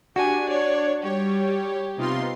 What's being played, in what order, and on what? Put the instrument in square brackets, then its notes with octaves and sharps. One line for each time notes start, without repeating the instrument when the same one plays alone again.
[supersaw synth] D4 [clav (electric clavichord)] F#4 [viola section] G4 [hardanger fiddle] G#5
[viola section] C#5 [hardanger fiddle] D5
[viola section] G3 [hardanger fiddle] G4 [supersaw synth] C#5
[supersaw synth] C3 F4 C6 [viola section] B3 D#4